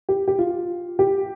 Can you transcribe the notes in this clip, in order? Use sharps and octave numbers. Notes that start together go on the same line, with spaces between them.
G4
G4
F4
G4